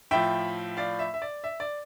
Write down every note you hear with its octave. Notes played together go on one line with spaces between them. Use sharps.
A2 F3 E5 G5
D5 F5
E5
E5
D5
E5
D5